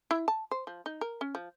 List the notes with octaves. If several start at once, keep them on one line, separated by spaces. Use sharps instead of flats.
E4
A5
C5
F3
D#4
A#4
C#4
F3